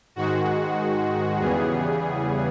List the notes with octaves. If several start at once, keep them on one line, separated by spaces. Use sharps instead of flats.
G#2 D#3 G#3 F#4
E2 C#3 E3 G3 B3 G#4